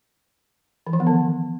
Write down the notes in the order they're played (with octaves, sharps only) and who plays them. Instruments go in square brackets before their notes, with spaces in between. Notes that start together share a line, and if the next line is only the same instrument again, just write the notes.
[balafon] E3
F3
B3
D#3